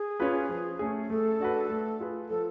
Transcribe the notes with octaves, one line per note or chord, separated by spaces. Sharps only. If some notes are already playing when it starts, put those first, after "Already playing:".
Already playing: G#4
C#4 F4 B4
F3
A3 C#4 G#4
A3 A4
D4 F#4 B4
A3
F4 G#4 B4
F3 A4